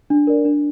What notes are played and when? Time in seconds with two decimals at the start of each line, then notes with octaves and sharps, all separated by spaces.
0.10 D4
0.27 A#4 D5
0.45 D4